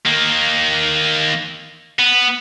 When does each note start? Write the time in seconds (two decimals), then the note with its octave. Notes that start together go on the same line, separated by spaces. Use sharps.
0.06 D#3 A#3
1.99 B3